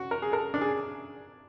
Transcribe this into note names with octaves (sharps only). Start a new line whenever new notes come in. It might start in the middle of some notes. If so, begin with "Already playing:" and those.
Already playing: F#4
A#4
G#4
A4 A#4
D4
G#4